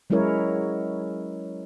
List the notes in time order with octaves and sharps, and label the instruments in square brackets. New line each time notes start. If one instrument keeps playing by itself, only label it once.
[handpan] F#3 G#3 C#4 E4 A#4 C#5